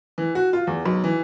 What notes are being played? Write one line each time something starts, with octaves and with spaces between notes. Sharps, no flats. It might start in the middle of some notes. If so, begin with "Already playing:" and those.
E3
F#4
F4
E2
B1
E3